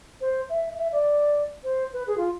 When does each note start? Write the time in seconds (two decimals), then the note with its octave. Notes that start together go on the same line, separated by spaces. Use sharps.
0.21 C5
0.49 E5
0.78 E5
0.92 D5
1.64 C5
1.93 B4
2.07 G#4
2.18 F4